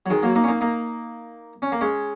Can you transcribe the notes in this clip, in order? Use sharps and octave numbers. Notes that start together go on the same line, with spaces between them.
F#3
D#3 G#3
F#3 A#3
A#3 D#4
C#4
A#3 D#4
A#3 D#4
C#4
A#3
G#3 C#4